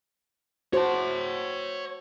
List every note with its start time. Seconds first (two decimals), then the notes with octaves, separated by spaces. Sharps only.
0.73 F#4 C5 C#5 A5